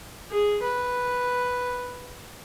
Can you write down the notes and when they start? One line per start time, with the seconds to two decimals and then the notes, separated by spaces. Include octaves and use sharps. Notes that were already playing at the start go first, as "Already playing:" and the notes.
0.31 G#4
0.63 B4